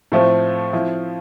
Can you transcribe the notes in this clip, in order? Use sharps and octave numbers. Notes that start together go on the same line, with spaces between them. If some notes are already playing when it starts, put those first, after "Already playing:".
A2 F3 A3 C4
F3 C4 E4